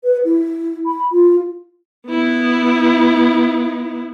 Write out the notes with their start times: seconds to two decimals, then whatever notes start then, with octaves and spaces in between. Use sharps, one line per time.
0.04 B4
0.25 E4
0.86 B5
1.12 F4
2.08 B3 E4